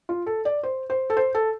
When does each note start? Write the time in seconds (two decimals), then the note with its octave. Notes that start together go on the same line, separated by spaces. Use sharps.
0.09 F4
0.26 A4
0.45 D5
0.63 C5
0.90 C5
1.10 A4
1.17 C5
1.35 A4